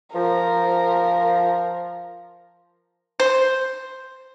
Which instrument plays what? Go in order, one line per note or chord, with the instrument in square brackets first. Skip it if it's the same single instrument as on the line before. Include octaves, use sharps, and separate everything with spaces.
[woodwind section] F3 [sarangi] A#4
[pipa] C5